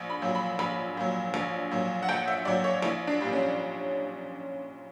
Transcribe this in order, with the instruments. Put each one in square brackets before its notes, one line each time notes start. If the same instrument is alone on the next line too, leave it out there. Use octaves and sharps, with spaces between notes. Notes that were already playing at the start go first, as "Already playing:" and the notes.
Already playing: [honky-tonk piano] A#1
B5
A#2 F#3
B5
A#1 B5
A#2 F#3
A#1
A#2 F#3
F#5
A#1 G5
E5
A#2 F#3 D5
C#5
A#1 E4
D4
A#2 G3
C#4